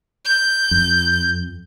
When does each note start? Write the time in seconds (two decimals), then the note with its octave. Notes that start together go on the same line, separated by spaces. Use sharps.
0.25 G6
0.71 F2